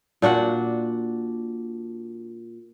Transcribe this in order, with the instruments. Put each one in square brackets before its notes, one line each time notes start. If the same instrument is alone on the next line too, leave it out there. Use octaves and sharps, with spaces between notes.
[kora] A#2 D4 F#4 F#5